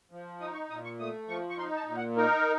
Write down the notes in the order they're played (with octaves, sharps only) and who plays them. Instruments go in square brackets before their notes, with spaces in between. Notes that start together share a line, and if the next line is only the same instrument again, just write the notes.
[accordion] F3
D#4 D#6
C#6
A#2 D#6
C#6
A3 D#6
F3 C#6
C#6
D#4 C6
A5
A#2
F#5
D#4 A#4